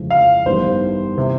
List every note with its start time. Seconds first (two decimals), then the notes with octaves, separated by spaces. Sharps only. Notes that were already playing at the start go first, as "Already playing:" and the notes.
Already playing: G1 F2 C#3 E3 G#3
0.10 F5
0.46 A1 G2 D#3 G3 B3 C5
1.18 C3